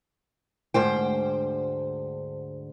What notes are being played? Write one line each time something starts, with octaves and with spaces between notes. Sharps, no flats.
D2 G#2 C5 G5